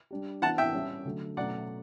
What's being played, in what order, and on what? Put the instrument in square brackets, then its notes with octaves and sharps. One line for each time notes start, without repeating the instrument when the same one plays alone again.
[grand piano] G3 D4 G4
[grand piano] E3 B3 D4 F#4 [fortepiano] F#5 A5
[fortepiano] E5 G5
[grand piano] G3 C#4 G4
D3 F#3 A3
[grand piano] B2 F#3 A3 C#4 F#4 [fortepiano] D5 F#5